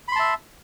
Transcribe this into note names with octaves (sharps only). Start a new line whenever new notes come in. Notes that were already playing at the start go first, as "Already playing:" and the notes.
E5 A5 B5 C6